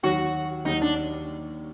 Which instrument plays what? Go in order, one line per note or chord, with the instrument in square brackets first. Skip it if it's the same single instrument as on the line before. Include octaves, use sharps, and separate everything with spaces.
[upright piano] D#2 D#3 F#3 [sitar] F#4
[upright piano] D#2 D#3 F#3 [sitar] D#4
[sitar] D4